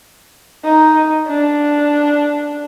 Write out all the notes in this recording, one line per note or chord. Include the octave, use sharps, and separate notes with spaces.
D#4
D4